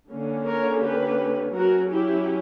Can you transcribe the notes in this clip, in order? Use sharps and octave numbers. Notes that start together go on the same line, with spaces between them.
D3 A#3 C#4
A#4 C#5
G4 B4
F#3 C#4 F#4 A#4
E4 G4